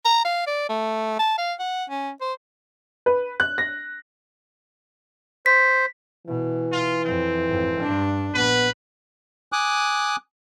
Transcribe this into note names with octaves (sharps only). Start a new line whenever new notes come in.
A#5
F5
D5
A3
A5
F5
F#5
C#4
C5
B4
F#6
A#6
C5 B6
B2 E3
F4
F2 C4
G#1 F2
G2 D4
A#1 B3 B4
G#5 D6 D#6 F#6